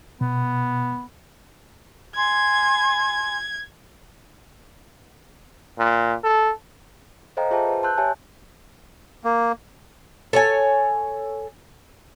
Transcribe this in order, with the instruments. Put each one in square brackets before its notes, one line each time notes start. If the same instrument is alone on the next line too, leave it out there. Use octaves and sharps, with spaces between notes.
[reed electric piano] B2 [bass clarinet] B3
[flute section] G#5 C6 [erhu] G#6
[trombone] A#2
A4
[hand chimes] A4 C5 D#5 F5 G5 A#5
F4 G#4 C5 E5 G5 A5
B4
A5 C6 E6 F#6 G6
G4 C#5 E5 G#5 A5
[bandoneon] A#3
[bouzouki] A4 C#5 G#5